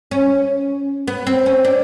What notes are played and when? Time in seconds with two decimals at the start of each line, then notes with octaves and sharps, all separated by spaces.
0.11 C#4
1.08 B3
1.27 C4
1.46 C#4
1.65 D4